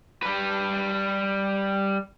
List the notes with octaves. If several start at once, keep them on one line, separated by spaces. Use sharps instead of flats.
G3 B4